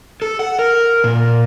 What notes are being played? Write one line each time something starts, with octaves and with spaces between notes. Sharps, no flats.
A4
F#5
A#4
A#2